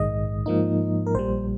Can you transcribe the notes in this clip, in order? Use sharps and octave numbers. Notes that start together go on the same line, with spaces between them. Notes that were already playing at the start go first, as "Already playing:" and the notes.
Already playing: A#1 G#2 D#3 G#3 D#5
G#2 F3 A#3 D#4
A#4
A#1 A#2 G3 C5